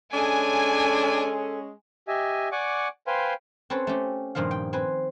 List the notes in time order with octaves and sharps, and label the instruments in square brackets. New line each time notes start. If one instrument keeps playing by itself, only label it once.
[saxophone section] G#3 C#4 [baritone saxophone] D4 [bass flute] A4 [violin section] G#5
[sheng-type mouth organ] G4 D#5 E5 G#5
D5 F#5 G#5 C#6 D6
B4 C5 F5 G5 G#5 C6
[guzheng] C4 C#4 A4 B4 C#5
A3 C#4 G4
G2 A#2 D#3 F3 F5
G5
C4 B4 G#5